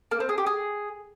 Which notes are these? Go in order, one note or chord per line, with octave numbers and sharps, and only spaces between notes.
A#3
C4
G#4
G4
G#4